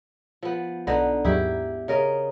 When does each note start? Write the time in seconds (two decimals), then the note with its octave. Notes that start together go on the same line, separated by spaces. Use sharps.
0.43 F3 B3
0.87 B1 D3 B3 D#4 A#6
1.25 D#2 G#2 F#3 E4 G4
1.88 C#3 A#4 D#5